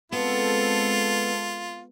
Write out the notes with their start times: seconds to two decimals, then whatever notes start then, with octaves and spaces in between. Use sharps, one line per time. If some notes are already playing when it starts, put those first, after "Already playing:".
0.12 G#3 B3 C4 F4 A4